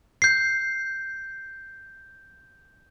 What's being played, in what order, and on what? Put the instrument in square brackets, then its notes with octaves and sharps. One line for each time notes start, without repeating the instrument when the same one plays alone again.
[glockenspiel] G6 C7